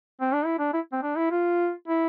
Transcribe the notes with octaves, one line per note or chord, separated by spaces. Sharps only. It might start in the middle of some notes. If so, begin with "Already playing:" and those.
C4
D4
E4
D4
E4
C4
D4
E4
F4
E4